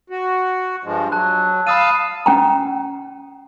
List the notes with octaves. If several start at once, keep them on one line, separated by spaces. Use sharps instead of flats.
F#4
G2 F3 G#3
F#3 A5 F#6
F5 A5 B5 D#6 E6 D#7
C#4 G5 A#5